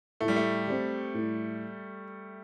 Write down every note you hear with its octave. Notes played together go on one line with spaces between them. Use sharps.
A2 A3
G3
A3
G3 C4
A2